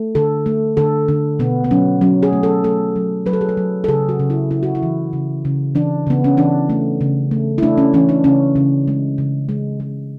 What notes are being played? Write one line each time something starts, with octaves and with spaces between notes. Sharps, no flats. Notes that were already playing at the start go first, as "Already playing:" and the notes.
Already playing: A3
D3 A4
A3
D3 A4
D3
B2 B3
B3
F#3 C#4
F#3 C#4
G#4
A3
A4
A3 A4
F#3
F#3 B4
A4
G#4
A4
F#3
A4
C#3 G#4
F#4
C#3
E4
C#3 E4
F#4
E4
E3
C#3
C#3
E3 D4
C#3 B3
C#4
E3 D4
A3
C#3
A3
E4
A3 D4
C#4
E3 C#4
D4
C#3 C#4
C#3
G#3
C#3
G#3
G#3